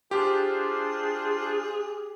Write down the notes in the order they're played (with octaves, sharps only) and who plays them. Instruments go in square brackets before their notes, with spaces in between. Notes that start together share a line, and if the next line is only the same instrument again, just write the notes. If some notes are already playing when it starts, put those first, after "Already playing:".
[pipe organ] D4 F4 C5 [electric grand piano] G4 [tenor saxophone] G#4